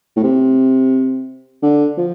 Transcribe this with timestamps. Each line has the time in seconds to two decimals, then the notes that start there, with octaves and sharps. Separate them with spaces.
0.16 A2
0.23 C3
1.63 D3
1.98 F3